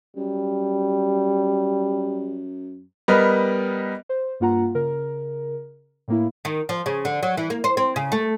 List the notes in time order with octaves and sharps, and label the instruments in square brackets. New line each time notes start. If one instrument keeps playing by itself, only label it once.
[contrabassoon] F#2 [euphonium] G3
[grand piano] G3 B3 A#4 D#5
[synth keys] C5
G2 A#3 F4 F#5 A#5
C#3 A#4
A2 A#3 E4
[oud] D#3
F3
C#3
D3
F#3
E3
A#3
C5
C4
C#3
A3